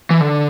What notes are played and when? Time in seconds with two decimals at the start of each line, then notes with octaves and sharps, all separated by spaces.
0.10 E3
0.21 D3